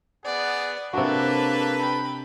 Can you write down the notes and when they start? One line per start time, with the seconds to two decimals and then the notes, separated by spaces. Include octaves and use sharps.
0.25 B3 G#4 D5 F#5
0.93 C3 A#3 D4 F#4 A4 B4
1.80 G5 B5